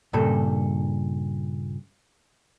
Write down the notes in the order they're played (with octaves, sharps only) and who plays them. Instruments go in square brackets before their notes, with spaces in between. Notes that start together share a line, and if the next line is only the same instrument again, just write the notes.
[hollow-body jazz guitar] G2 A#2 C#3 A4